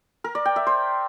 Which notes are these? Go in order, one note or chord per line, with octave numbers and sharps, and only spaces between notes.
A#4
D5
G5
E5
C5